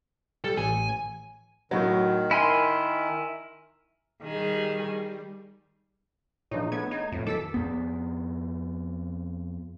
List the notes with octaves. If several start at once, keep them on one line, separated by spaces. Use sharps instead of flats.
G3 A4
A1 G#5
A2 D#3 F#3
E4 A#4 G#5 C6 F6
D#3 G3 G#4
A#2 E3 F3 D4 D#4 G#4 C#5
A3 B3 G#6
D#4
F2 A2 F3 B3
D#3 E3 F#3 A4 D6 E6 B6
F2 B3